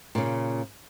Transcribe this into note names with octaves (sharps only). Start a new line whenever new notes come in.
A#2 C#3